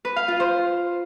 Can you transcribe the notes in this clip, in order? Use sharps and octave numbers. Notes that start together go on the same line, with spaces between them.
B4
F5
F4
C5